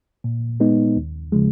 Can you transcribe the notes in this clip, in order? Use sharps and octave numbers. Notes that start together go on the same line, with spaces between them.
A#2
G#3 B3 D#4
D#2
C#3 F3 G#3